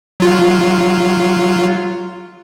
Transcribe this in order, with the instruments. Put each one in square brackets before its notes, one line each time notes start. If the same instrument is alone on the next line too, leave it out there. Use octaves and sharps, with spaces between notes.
[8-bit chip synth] F#3 F4